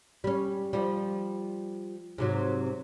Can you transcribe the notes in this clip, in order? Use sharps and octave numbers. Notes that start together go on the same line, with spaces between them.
G3 C#4
F3 G3
G#2 C3 F#3